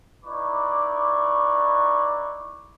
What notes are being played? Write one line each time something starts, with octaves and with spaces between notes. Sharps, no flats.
D#4 E4 B4 D5 C#6 D6